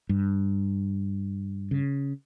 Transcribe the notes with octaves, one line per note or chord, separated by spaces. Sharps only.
G2
C#3